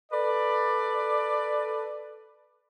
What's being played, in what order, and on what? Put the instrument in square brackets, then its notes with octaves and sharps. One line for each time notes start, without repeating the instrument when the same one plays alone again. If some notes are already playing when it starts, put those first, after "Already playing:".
[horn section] A4 B4 D5